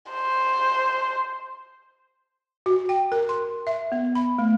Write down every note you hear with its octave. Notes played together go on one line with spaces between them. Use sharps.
C5
F#4
G5
A#4
C6
E5
B3
B5
A3